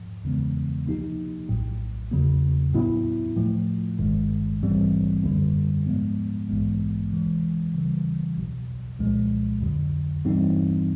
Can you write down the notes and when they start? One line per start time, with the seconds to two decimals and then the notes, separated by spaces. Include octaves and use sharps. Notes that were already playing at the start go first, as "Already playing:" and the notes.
Already playing: G#2 F3
0.23 E2 C#3 E3 G#3 B3
0.86 C3 F3 A#3 D#4 G4
1.49 A#1 A2 F#3
2.11 E2 C#3 F#3 A#3
2.74 A2 F#3 B3 E4
3.37 A2 F3 A3
3.99 G1 G2 D#3 G#3
4.62 A#1 G#2 E3 G3 C4
5.24 F#2 D3 G3 A#3
5.86 G#2 F3 G#3 B3
6.49 A#1 G#2 E3 G#3 B3
7.12 C3 E3 G#3
7.75 C#3 E3 G3
8.37 B1 B2 F#3
8.99 C2 A#2 F3 G#3
9.62 F2 D3 F#3
10.25 G2 E3 G3 C4 D#4